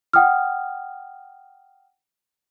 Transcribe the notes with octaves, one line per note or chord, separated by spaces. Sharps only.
F#5 G5 D#6 F6